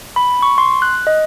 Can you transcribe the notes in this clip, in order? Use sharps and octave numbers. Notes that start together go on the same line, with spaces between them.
B5
C#6
C6
F#6
D#5